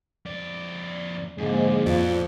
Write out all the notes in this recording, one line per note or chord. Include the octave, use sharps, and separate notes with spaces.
F2 D5
F2 G#2 D3 G#3 A#3
F2 A2 F4 D5